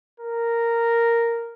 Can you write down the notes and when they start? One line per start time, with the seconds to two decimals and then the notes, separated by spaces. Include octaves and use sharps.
0.20 A#4